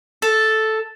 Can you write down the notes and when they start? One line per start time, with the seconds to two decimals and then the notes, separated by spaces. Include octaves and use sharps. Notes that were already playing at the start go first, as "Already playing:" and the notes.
0.22 A4